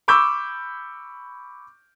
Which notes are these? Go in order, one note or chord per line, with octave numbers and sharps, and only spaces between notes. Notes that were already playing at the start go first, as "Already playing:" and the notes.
B5 C#6 D6 E6 G6